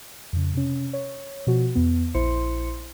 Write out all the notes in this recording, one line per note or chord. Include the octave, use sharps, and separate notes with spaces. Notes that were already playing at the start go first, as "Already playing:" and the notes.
F2 C#3
C3 C#4
C#5
B2 F3 F#4
E2 B3
A#1 E4 C5 C6 C#7